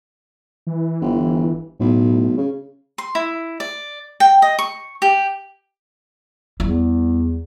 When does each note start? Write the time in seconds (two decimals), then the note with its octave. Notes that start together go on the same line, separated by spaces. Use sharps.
0.67 E3
1.01 G1
1.79 B1 A2
2.37 C#3
2.98 C6
3.15 E4
3.60 D5
4.20 G5
4.42 D#5
4.59 C#6
5.02 G4
6.60 E2 G3 E4